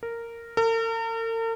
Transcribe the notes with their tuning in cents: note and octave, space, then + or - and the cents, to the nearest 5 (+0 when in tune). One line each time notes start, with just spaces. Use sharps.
A#4 -10
A#4 -45